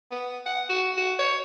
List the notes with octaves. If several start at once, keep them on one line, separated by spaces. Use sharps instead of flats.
B3
F#5
F#4
F#4
C#5